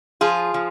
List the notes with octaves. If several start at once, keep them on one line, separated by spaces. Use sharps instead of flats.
F3 F4 G#4
F3